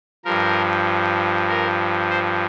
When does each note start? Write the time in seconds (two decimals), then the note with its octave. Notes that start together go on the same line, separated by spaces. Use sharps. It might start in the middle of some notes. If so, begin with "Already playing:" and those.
0.25 G2 F3 A#4
1.49 A#4
2.10 C5